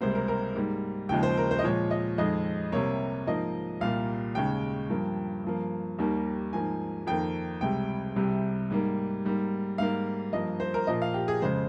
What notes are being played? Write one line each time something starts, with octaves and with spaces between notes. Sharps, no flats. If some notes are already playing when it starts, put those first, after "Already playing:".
C#2 C3 G3 A#3 C5
A#4
A#4
G#2 G3 A#3
D#2 C#3 F3 G#3 G5
C5
A#4
C5
D#5
A#2 F3 G#3 C#5
D#5
F2 D#3 G#3 D#5
C2 C3 G3 A#3 C#5
G#2 F3 A#3 D#5
C2 A#2 G3 A#3 F5
D#2 C#3 G#3 G5
G2 F3 A#3
G2 F3 A#3
D#2 D#3 G3 A#3
G#2 F3 A#3 G#5
F2 D#3 A#3 G5
C#2 C3 G3 G5
C2 C3 G3
G#2 G3 A#3
G#2 G3 A#3
G#2 G3 A#3 F5
G2 F3 A#3 D#5
C5
A#4
A#2 F3 A#3 D#5
F5
G4
G#4
F2 C#3 G#3 C5